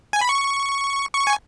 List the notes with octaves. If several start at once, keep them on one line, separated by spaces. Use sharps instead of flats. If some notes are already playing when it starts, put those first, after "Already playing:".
G#5
B5
C#6
C#6
G#5